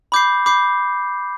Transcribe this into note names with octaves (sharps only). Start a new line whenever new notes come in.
B5 D6 G6 C7
B5 D6 G6 C7